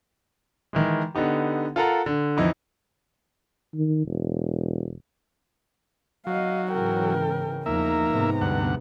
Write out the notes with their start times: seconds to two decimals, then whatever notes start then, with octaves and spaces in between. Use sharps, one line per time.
0.73 D#3 E3 G#3
1.15 D3 B3 D#4 G4
1.76 F4 A4 A#4 F#5 A#5
2.06 D3
2.37 F2 E3 D#4 E4
3.74 D#3
4.06 E1
6.27 F#3 D#5 F5
6.72 G#2 C#3 E3 A#4 G5
7.66 E2 F3 A#3 D#4 E5 A#5
8.10 G#2 C3 B3
8.41 D2 G2 F#5